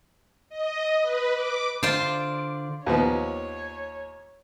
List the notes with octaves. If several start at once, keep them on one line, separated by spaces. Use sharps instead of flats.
D#5
B4
D6
D3 F4 C5 D5
D#2 F3 B3 C#5